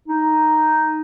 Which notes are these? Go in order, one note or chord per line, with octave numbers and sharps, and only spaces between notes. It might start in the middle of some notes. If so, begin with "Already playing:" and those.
D#4